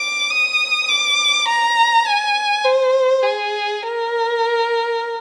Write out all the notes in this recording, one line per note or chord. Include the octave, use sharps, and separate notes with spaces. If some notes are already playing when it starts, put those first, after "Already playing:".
Already playing: D6
D#6
D6
A#5
G#5
C5
G#4
A#4